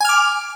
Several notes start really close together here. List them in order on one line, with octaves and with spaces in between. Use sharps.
G#5 F6 D6